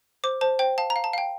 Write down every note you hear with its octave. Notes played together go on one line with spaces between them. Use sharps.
C5 D6
C5 A5
C5 G5
F5 A5
A#5
F5
A5
F5 G5